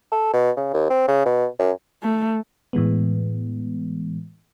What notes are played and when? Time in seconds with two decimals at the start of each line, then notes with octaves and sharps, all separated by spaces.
0.12 A4
0.33 B2
0.57 C#3
0.74 D#2
0.90 C4
1.08 C#3
1.26 B2
1.59 F#2
2.03 A3
2.73 A2 E3 G#3 B3